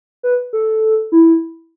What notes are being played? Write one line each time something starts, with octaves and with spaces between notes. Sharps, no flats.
B4
A4
E4